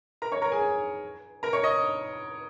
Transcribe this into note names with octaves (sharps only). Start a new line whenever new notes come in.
A#4 A#5
C#5 C#6
A#4 A#5
G#4 G#5
A#4 A#5
C#5 C#6
D#5 D#6